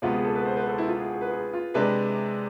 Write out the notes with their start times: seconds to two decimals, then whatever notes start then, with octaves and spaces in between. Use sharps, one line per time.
0.02 D2 C3 G#3 B3 F4
0.13 G#4
0.25 A4
0.35 B4
0.45 C5
0.56 B4
0.67 A4
0.78 E4
0.88 F4
0.99 G#4
1.10 G#4
1.21 B4
1.31 G#4
1.53 F4
1.74 C3 G#3 D4 B4